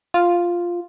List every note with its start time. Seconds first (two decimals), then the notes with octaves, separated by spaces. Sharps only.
0.14 F4